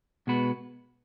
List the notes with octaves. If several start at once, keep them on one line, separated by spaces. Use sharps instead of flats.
B2 G#3 B3 F#4 B4